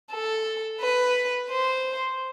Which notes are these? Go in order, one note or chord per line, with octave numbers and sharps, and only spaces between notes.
A4
B4
C5